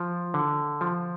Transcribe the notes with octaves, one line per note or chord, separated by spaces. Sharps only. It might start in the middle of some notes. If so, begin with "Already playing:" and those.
Already playing: F3
D3
F3